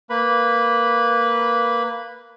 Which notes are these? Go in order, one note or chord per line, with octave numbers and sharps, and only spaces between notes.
A#3 B4 B5